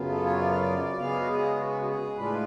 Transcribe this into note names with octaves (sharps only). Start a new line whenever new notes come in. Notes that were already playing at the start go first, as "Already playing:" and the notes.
Already playing: F#2 C#3 F#3 B3 F4
A4
C#5
D5
F5
D5
C#3 G#3 B3 F5
F#4
G#4
F#4
F#4
G#4
A2 G#3 D4 F4 B4